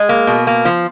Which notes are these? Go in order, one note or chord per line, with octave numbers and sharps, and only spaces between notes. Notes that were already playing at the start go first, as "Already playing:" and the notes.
Already playing: G#3
A#3
B2
A#3
F3